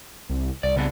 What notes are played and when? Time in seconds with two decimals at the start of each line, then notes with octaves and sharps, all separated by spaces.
0.29 C2
0.63 C2 D5
0.76 C#3 B3 D4